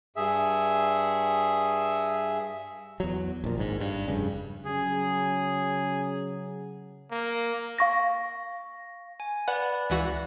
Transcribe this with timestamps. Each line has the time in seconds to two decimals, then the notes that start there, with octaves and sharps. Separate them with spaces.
0.16 G2 G#4 E5
3.00 E2 F#3
3.44 A#1 A#2
3.57 G#1 G#2
3.80 G2
4.08 F1 G2 C#3
4.65 C#3 F#3 G#4
7.11 A#3
7.78 F5 C#6 A#6
9.20 G#5
9.48 B4 D5 F#5 B5
9.90 C#2 E3 F#4